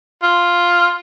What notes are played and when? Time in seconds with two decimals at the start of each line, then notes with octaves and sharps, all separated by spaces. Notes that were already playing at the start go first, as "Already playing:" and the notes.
0.23 F4